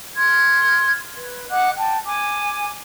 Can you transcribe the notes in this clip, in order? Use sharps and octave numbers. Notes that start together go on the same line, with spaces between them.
C6 F6 G#6
B4
D#5 F#5 D6 F#6
G5 A5
G#5 D6